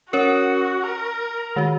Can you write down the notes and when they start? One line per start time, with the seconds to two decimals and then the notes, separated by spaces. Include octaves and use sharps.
0.13 C#4 F#4 A#4 C#5
0.84 A#4
1.56 D#3 G#3 F#4